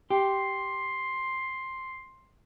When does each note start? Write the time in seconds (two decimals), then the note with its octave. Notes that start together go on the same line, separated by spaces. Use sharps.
0.10 G4 C6